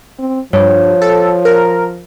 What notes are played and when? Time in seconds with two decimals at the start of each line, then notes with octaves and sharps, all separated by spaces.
0.19 C4
0.53 G2 F3 C#5
1.02 A4
1.45 A#4